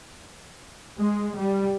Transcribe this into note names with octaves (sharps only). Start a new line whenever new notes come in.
G#3
G3